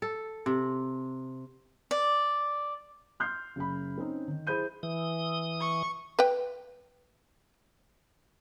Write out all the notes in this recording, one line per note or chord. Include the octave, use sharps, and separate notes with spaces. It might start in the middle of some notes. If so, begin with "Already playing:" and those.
A4
C3
D5
C6 F6 G6 C7
F#1 B5
C4 C#4 D#4
D#3
E4 G#4 C5 B5 G6 D#7
E3 D#6
C#6
B4 G5